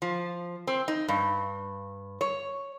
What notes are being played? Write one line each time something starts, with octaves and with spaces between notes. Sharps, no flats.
F3
C4
D#4
G2
C#5